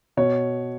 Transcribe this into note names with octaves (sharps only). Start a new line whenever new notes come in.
B2 C#5